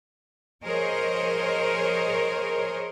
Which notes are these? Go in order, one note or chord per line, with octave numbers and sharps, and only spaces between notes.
F3 G#4 A#4 C5 C#5 D#5